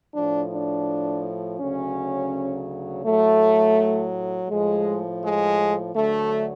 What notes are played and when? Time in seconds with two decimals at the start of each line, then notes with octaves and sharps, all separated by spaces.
0.14 A2 F3 D4
0.52 D4
1.60 D2 C#3 F#3 C#4
3.05 A2 F#3 A3
4.49 A2 F3 G#3
5.23 G#3
5.94 D2 D3 F#3 A3